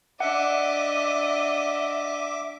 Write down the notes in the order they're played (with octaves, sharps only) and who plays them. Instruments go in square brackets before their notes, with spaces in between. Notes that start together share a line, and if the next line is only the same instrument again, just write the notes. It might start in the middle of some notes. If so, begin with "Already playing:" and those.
[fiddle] D4 D#5 [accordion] E5 D6 [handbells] F#5